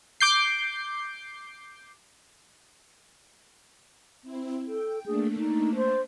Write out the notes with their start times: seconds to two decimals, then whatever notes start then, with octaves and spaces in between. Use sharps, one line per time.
0.21 D6 G6 C7
4.22 C4 E4
4.67 A4 G5
5.06 A3 A#3 D4 G#4
5.37 D#4
5.76 C5